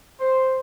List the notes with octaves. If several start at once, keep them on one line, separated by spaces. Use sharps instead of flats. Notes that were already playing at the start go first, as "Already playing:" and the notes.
C5